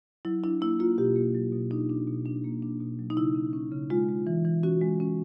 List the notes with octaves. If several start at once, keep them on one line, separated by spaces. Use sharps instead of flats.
F#3 E4
D4 E4
A#3 E4
A#3 F4
B2 G4
A#3
F#3
B2
D4 D#4
D4
B2
D4
A#3
D4
B2
F#3
D#4
C#3 E4
C#4
C#4
C#3
G#3 F4
G#3
E3
E3
C#4 F#4
G#3
C#4